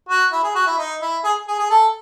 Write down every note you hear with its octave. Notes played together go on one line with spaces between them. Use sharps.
F#4
E4
G#4
F#4
E4
D#4
E4
G#4
G#4
G#4
A4